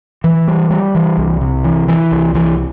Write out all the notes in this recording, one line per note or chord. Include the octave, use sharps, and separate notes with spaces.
E3
G3
G3
E3
C2
C3
E3
E3
C2
E3